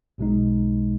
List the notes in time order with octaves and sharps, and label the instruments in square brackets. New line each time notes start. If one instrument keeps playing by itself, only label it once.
[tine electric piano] B1 B2 G#3 D#4